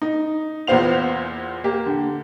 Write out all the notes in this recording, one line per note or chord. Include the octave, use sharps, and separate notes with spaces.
D#4
E2 A#2 B3 C5 F5 F7
A#3 G4
D3